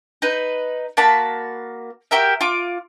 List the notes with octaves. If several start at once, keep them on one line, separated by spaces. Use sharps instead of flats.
D#4 B4
A#3 F#4 A5 B5
F#4 G4 A#4 E5
F4 D6